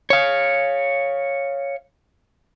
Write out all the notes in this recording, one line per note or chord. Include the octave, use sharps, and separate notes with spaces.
C#5 F5